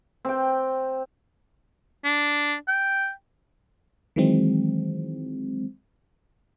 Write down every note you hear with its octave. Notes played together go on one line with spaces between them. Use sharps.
C4 G5
D4
G5
D#3 E3 F#3 G#3 C4